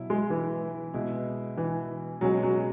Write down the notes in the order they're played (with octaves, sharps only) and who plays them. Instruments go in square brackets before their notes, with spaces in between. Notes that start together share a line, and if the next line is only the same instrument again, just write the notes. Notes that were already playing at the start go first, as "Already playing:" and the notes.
Already playing: [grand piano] B2 F#3 E4
[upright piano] G#3
E3
[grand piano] B2 G#3 E4
[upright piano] E3
[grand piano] B2 G#3 C#4 G#4 [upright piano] F#3
[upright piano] F#3